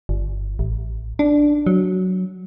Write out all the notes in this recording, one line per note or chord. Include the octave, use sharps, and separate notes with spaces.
G1
A1
D4
F#3